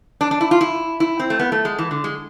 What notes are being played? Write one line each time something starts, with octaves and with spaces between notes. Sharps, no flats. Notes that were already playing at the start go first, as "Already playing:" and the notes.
D4
D4
E4
F4
E4
E4
C4
A3
B3
A3
G#3
E3
D3
G#3